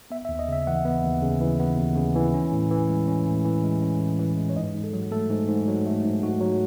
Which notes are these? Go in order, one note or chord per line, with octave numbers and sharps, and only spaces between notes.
B3 E5
E5
D#2
D#5
C#3 E5
E3 F#5
B3
D#2
C#3
E3
B3
D#2
C#3
E3
C#4
A2
E3
G#3
C#4
A2
E3
G#3
C#4
A2
E3
G#3
C#5
G#2 D#5
G#2
A4
F#3
A3 A4
G#2
G#2
F#3
A3
G#2
G#2 F#4
F#3